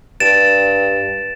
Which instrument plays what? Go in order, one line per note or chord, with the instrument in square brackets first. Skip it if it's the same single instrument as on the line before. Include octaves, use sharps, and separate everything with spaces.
[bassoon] G2 [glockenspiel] A6 D7 E7